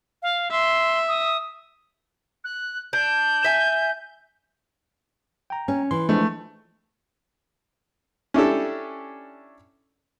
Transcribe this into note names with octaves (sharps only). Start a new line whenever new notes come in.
F5
E5 C6
D#6
F#6
D4 G6
E5 G#5
G5 A#5
C#4
E3 C6
F3 G#3 A3 D4
C#4 D4 E4 G4 A4